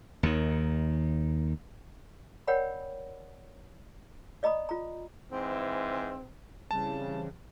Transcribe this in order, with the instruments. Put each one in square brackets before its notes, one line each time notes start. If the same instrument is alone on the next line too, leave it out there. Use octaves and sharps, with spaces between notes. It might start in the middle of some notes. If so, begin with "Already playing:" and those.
[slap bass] D#2 D#3
[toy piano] A#4 C#5 D5 F#5 G5 B5
D5 D#5 A#5 B5 D#6
F4 A#5
[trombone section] G#2 E3 [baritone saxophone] C4
[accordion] C#3 [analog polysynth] E3 G3 C4 [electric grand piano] A5